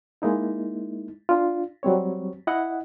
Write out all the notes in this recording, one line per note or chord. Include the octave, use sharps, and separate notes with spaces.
G#3 A#3 D#4 E4
D4 F4
F#3 G3 C4 C#5
E4 D#5 F#5